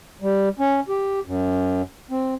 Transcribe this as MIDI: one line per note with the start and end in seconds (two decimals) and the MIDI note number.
0.22 0.49 55
0.59 0.80 61
0.89 1.20 67
1.26 1.82 42
2.11 2.35 60